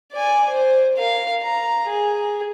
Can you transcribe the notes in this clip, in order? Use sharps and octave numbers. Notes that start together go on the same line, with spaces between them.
D5 G#5
C5
A#4 F5
A#5
G#4